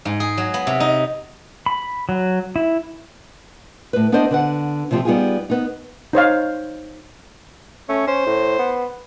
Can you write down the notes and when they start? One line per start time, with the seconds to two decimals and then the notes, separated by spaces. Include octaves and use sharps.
0.05 G#2
0.20 G#4
0.37 F#3
0.54 B3
0.67 C3
0.80 D#4
1.66 B5
2.09 F#3
2.56 E4
3.93 A2 B4
4.12 B3 D4 E4 A#4 C5 D#5
4.31 D3 B4 F#5
4.91 C3 D#3 F3 C4 F4 G4
5.05 G3 B3 D#4 F4 G4 G#4
5.50 B3 D#4
6.13 D#4 C5 C#5 F5
7.89 A3 C#4
8.07 C#4 C5
8.27 A2
8.59 B3